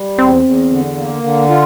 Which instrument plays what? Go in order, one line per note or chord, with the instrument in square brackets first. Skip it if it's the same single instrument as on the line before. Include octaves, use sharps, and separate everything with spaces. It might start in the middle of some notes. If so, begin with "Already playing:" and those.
Already playing: [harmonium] G3
[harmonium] E2 [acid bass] C4
[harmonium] E2
D3
A#3
D3
F4